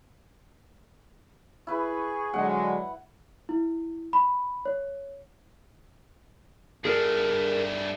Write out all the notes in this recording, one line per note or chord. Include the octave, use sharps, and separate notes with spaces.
E4 G#4 B4 B5 C#6
D3 F#3 G#3 F#5
E4
B5
C#5
G2 A3 G#4 A#4